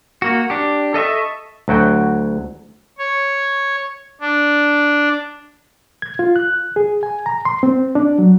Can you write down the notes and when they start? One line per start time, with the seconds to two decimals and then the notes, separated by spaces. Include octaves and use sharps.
0.22 A#3 F#4
0.50 D4 G4
0.94 A4 D#5 E5 C#6
1.68 D2 F#3 F#4 G5
2.98 C#5
4.21 D4
6.02 G#6
6.19 F4
6.36 F#6
6.76 G#4
7.03 G#5
7.26 A#5
7.45 C6
7.63 C4
7.95 D4
8.19 F#3